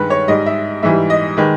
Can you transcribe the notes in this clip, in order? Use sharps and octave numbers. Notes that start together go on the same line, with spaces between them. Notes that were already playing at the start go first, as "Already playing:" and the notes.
Already playing: G2 D#3 G#3 B4
C#5
G#2 G3 D#5
E5
G#2 E3 G3 E5
D#5
D#3 G#3 B4